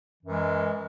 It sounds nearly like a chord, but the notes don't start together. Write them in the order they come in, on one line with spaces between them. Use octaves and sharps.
E3 F#2 G#3